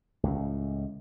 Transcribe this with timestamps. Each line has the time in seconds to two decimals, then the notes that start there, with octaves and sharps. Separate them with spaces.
0.23 C#2 A2